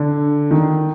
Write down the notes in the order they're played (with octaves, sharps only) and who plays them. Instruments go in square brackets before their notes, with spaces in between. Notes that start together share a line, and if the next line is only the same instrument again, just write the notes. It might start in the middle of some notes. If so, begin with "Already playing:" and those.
Already playing: [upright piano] D3
D#3